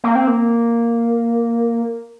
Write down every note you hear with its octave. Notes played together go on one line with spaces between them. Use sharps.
A#3
C4
A#3